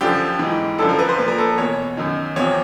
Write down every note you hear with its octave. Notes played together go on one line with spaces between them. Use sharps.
F#2 D3 F3 G4
G#2 E3
F#2 D3 F3 A4
A#4
B4
C5
A#2 F3 B4
A#4
A4
E2 B2 C#5
F#2 D#3
E2 C3 F3 C#5